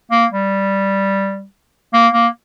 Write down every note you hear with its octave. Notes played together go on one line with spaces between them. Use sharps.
A#3
G3
A#3
A#3